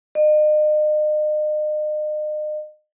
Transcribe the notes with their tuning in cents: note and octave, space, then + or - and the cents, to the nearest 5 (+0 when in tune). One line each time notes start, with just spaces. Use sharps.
D#5 -40